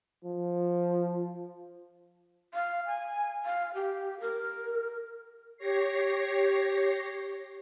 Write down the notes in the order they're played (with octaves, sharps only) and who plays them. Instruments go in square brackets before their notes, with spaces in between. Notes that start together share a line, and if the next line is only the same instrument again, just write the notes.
[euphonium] F3
[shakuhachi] F5
G#5
F5
G4
A#4
[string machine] G4 C#5 A#6 C7